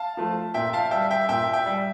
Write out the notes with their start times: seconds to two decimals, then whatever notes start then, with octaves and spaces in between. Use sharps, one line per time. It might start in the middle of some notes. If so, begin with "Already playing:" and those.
Already playing: F5 A5
0.17 F3 A3
0.54 A#2 E5 G5
0.73 F5 A5
0.91 G3 E5 G5
1.11 E5 G5
1.29 A#2 E5 G5
1.53 E5 G5
1.66 G3